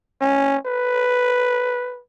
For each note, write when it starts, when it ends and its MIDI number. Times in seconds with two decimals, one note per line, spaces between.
0.21 0.57 61
0.66 2.01 71